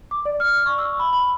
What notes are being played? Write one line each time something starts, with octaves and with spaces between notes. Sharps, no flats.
D6
D5
F6
C#6
E6
B5
B5